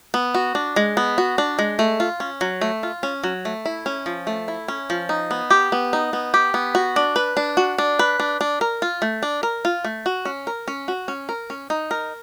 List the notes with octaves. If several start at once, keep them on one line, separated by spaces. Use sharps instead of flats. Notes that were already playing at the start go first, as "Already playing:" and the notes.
B3
F#4
D4
G#3
B3
F#4
D4
G#3
A3
F4
C#4
F#3
A3
F4
C#4
F#3
A3
E4
C#4
F3
A3
E4
C#4
F3
D#4
B3
G4
B3
D#4
B3
G4
B3
F#4
D4
B4
D4
F#4
D4
B4
D4
D4
A#4
F4
A3
D4
A#4
F4
A3
F#4
C#4
A#4
C#4
F#4
C#4
A#4
C#4
D#4
A#4